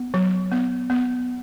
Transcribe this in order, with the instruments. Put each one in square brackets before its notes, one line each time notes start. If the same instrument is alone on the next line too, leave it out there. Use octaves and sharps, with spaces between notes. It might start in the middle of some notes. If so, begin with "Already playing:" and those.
Already playing: [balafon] B3
F#3
B3
B3